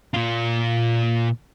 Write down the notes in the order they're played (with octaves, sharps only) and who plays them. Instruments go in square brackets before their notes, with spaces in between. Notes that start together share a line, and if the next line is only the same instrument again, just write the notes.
[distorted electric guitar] A#2 F4